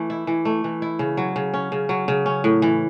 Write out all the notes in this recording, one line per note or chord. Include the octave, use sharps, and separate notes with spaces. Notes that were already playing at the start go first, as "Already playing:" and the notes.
Already playing: E3 A3
E4
E3
A3
E3
E4
C#3
F#3
C#3
C#4
C#3
F#3
C#3
C#4
A2
E3